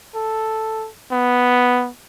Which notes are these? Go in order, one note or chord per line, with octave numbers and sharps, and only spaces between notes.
A4
B3